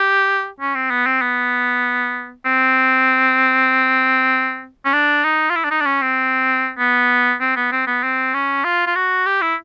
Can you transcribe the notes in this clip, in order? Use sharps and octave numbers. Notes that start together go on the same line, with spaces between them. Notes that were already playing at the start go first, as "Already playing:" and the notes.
Already playing: G4
C#4
C4
B3
C4
B3
C4
C#4
D4
D#4
F4
E4
D4
D#4
D4
C#4
C4
B3
C4
B3
C4
B3
C4
C#4
F4
F4
F#4
G4
E4